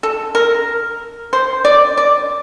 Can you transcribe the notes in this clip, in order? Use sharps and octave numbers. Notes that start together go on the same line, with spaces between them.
A4
A#4
C5
D5
D5